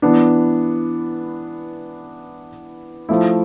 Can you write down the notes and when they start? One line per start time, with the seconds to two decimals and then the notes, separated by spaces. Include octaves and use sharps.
0.02 E3 B3 D4
3.09 F3 A3 E4